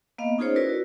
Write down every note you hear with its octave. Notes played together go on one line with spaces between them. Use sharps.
A#3 B3 D#5 F5
C#4 D#4 F4 G#4 C5 C#5
E4 F#4 A#4 B4 D5
F#4